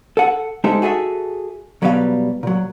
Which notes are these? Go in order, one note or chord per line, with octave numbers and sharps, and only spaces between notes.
A4 F#5
G#3 D#4 G4 A4 C5 E5
F#4 G#4 A4 E5
B1 F#3 G3 B3 D5 F5
A#2 F#3